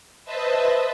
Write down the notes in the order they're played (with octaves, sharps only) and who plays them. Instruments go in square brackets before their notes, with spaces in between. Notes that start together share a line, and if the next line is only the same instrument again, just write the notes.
[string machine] B4 C5 D#5 E5 A5